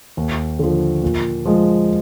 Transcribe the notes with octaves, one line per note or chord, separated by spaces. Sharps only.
D#2
D3 F3
A#2
F3 G#3